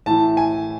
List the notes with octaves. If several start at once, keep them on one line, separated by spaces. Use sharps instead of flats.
A2 E3 A5
G#5